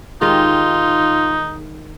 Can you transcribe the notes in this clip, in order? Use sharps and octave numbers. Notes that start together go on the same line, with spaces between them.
D#3 G#3 D#4 F4 G4